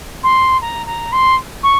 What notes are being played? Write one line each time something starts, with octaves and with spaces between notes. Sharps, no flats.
C6
A#5
A#5
C6
C#6